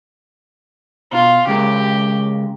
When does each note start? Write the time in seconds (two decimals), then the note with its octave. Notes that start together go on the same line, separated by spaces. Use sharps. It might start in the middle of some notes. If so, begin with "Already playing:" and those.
1.12 B2 F4
1.47 C#3 G#3 G4 A#4